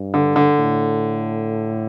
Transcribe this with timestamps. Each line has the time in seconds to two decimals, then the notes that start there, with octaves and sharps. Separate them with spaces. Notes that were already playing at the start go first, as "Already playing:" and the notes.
Already playing: G2
0.14 D3
0.36 D3
0.59 A2